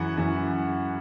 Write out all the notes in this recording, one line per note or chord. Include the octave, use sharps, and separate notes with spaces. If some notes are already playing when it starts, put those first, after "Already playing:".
Already playing: F#2 E3 F#5 B5
F#2 E3